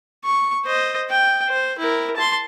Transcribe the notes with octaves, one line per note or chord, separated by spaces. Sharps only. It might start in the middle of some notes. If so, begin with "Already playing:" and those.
C#6
C5 D#5
G5
C5
E4 A#4
A5 C6